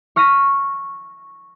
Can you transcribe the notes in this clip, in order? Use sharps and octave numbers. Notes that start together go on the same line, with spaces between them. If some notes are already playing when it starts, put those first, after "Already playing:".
C#6 F6 A#6 B6 D#7